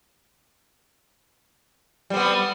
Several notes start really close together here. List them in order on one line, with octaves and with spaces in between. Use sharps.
G3 C4 B3